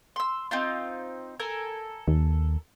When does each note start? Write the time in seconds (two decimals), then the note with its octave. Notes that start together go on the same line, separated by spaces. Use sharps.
0.16 C6 E6
0.51 C4 D#4 F4
1.40 A4 A#4 G#5
2.08 D#2